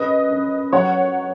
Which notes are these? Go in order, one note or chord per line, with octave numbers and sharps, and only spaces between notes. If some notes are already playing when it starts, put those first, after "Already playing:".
Already playing: F#2 B4 D#5
F#2
F#3 C#5 F#5